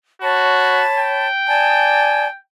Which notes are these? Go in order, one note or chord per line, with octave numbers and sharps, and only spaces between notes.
F#4 C#5 A5 B5
G5
D5 G#5 A5